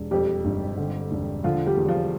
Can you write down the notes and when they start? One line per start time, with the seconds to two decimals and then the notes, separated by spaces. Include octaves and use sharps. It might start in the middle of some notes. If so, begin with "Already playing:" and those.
Already playing: E1
0.11 F2 G3 G4
0.45 G1
0.77 D3
1.11 E1
1.44 D3 F3 F4
1.66 G3 G4
1.77 E2
1.88 F3 F4